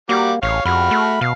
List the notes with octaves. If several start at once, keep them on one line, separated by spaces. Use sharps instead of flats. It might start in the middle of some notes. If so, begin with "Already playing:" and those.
G3 A#3 F#4 D6
A1 C#5 F5
F2 F#4 B5 F6
A3
B2 F5